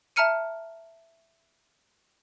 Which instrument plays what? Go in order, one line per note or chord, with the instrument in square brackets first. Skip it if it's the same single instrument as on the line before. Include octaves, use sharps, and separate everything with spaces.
[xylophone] E5 A5 A#5 F6 C#7 D#7